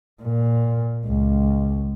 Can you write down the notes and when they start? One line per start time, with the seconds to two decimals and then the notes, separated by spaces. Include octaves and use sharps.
0.22 A#2
1.06 C#2